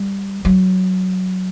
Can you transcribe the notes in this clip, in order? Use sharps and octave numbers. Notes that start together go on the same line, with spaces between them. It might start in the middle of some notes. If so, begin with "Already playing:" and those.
Already playing: G3
F#3